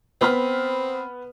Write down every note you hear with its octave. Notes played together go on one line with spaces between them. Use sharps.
B3 C4 B5 F6